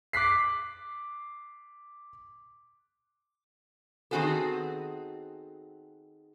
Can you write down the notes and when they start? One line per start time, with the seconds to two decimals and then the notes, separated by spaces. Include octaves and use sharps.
0.13 D6 F#6 B6 C7
4.11 D#3 B3 C4 F#4 G#4 A4